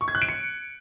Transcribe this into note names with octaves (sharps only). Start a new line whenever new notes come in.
C#6
G#6
F#6
D7
C#7